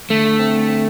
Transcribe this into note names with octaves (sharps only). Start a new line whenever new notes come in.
D3 A3
D3
C4
D3
C4